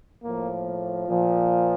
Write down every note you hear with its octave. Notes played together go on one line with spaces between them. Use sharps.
A2 F3 A#3
A#2 F3